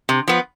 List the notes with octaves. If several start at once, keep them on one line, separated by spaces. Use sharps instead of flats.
C3
F3 B3